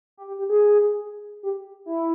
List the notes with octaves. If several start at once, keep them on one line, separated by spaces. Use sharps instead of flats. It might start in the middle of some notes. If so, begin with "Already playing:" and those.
G4
G4
G4
G#4
G4
E4